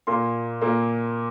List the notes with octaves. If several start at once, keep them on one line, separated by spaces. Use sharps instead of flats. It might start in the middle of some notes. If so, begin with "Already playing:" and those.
A#2 A#3 C6
A#2 A#3